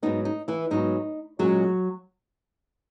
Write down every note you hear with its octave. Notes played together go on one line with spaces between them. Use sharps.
G#2 F#3 B3 D#4
D#4
E3 E4
G#2 F#3 B3 D#4
A#2 F#3 G#3 C#4 F#4